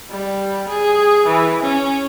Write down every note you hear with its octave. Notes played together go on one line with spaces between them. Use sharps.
G3
G#4
E3
C#4